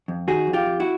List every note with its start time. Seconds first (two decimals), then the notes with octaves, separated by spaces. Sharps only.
0.08 F2
0.28 D#3 F#4 G#4
0.47 F2
0.53 F4 G4
0.66 F2
0.80 E4 F#4